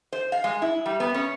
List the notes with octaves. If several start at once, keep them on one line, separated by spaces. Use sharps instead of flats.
C5
F5
G#3
E4
G3
B3
C#4